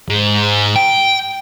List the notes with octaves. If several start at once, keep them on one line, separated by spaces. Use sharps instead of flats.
G#2
G5